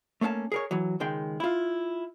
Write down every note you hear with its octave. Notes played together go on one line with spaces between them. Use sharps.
A3 A#3 C#4 F5 A5
G#4 A#4 C#5
E3 F#3
C#2 D#3 G#3 G5
E4 F4